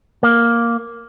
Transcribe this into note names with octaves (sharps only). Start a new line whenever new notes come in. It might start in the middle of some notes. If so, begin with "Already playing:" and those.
A#3